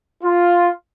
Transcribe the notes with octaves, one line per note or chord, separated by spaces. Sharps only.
F4